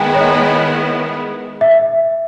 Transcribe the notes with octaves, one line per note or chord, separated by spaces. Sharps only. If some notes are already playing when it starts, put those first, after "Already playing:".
Already playing: D#3 G#3 B3 E4 G5 G#5 A#5
C#5
D#5
E5